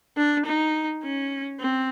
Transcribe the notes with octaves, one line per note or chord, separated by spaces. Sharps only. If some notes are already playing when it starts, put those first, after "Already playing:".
D4
D#4
C#4
C4